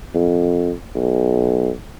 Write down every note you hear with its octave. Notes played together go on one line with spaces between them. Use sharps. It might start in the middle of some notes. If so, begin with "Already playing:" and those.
F2
B1